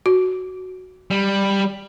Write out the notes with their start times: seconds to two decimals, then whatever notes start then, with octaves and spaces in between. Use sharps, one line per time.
0.06 F#4
1.10 G3